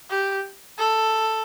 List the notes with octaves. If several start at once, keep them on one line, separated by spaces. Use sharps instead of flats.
G4
A4